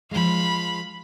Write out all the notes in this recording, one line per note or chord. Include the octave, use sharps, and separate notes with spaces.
F3 G#3 F5 B5